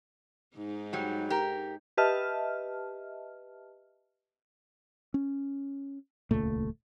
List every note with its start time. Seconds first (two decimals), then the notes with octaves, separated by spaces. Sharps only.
0.56 G#2 D#4
0.93 F#3 G3 G4
1.30 G4 A#4
1.97 G4 B4 D#5 E5 A5 F6
5.14 C#4
6.31 D#1 C#2 A#2 A3